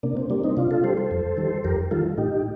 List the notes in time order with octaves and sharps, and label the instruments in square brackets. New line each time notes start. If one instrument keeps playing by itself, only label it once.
[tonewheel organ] C3 A#3 D4
C4
G3 A#3 D4
C4 D#4
C3 D4 F4
F4 A4
G3 A4 C5
A4 C5
F2
D#3 G3
F2 G4 A#4
D#3 G3 F4 A4
A2 D#4 G4